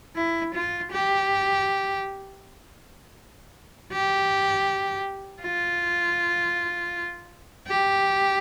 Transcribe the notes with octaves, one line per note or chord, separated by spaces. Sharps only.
E4
F4
G4
G4
F4
G4